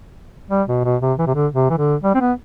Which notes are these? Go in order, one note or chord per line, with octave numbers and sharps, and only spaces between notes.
G3
B2
B2
C3
E3
C3
D3
C3
E3
D3
G3
C4
B3